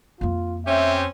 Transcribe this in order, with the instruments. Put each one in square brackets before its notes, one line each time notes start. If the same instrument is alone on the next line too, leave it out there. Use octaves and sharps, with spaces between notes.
[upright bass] F2 A#3 [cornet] F4
[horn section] C4 C#4 G4 [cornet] E5